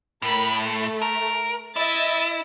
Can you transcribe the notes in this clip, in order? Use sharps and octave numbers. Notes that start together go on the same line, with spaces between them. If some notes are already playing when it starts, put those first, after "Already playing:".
A2 A#4 B5
A3
A#4
E4 D#5 E5 A6